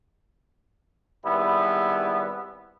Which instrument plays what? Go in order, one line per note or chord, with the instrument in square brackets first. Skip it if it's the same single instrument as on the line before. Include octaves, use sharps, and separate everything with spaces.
[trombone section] G#1 G3 B3 E4